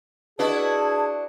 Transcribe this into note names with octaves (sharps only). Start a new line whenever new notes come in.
D4 E4 F#4 G#4 B4 D#5 A5